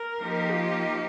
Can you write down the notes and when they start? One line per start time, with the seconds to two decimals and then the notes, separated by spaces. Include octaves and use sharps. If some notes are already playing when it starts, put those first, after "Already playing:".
Already playing: A#4
0.18 F3 A#3 D#4 G4
0.52 F4